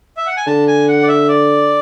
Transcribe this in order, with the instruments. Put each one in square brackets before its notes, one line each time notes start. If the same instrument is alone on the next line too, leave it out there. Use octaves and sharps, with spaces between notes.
[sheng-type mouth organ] E5
F#5
G#5
[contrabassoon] D3 [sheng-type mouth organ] A5
[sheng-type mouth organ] G#5
F#5
D5
E5
D5